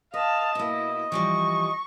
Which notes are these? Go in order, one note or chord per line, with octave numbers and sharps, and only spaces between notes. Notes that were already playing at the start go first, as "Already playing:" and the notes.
B4 D#5 F5 A5
B2 A#3 E4
E3 F3 G3 C#6